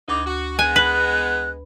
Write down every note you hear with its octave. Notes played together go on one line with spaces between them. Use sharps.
D2 E3 G#3 D#4 D6
F#4
G#3 B3 G#5 F#6
B4